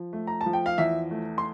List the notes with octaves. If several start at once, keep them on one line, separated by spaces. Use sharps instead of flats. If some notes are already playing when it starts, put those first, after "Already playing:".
Already playing: F3
A3
A#5
A5
F3
G5
F5
E2 E5
A3
C6